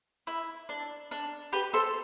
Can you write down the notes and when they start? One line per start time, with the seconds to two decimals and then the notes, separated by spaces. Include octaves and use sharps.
0.27 E4
0.69 D4
1.11 D4
1.53 G4 B4
1.73 A4 C5